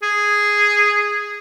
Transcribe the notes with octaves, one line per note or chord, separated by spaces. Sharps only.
G#4